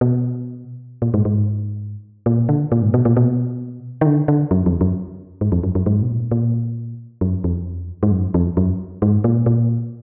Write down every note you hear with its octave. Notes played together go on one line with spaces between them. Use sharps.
B2
A#2
G#2
G#2
A#2
D3
A#2
G#2
B2
A#2
B2
D#3
D3
D3
F#2
F2
F#2
G#2
F2
F#2
F#2
G#2
B2
A#2
A#2
F#2
F2
G#2
F#2
F2
F#2
G#2
A#2
A#2